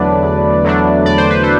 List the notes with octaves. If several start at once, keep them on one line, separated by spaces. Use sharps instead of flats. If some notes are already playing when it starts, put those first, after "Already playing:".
Already playing: E2 D3 F#3 A3 D4 B4 D5
E2
D3 F#3 A3 D4
E2 D5
C5
B4
A4 C5